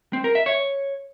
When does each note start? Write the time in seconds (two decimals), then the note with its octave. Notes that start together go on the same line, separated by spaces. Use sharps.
0.13 C4
0.24 A#4
0.35 E5
0.46 C#5